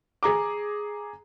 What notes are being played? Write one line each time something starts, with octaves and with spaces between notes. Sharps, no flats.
G#4 A#5 D6